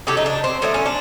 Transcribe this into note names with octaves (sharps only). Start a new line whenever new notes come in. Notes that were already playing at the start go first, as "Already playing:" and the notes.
C#3 F#3 A3 G4
D#4
D4
C4
A2 F#3 A3 D4
C#4
D4